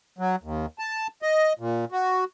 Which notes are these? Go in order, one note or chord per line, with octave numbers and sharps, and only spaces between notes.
F#3
D#2
A5
D#5
A#2
F#4